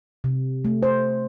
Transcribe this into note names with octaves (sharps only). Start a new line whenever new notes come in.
C3
A3
C5